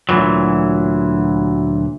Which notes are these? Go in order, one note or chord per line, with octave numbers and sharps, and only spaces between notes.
D2 A#2 D#3 E3 F#3